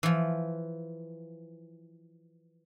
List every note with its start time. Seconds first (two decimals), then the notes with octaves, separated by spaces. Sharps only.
0.03 E3 F3